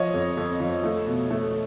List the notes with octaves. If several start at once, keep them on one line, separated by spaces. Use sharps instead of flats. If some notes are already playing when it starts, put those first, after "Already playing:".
Already playing: F3 C#5 D#5
F2
F2
F3
A3
B2
A3